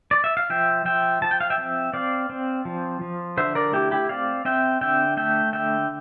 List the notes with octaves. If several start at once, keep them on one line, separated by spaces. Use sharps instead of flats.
D5
E5
F5
F3 E5 G5
F3 E5 G5
F3 A5
G5
F5
E5 G5
C4
C4 D5 F5
C4
F3
F3
D3 C5 E5
A#4 D5
A3 E4 G4
E4 G4
C4 D5 F5
C4 E5 G5
D3 E5 G5
A3 E5 G5
D3 E5 G5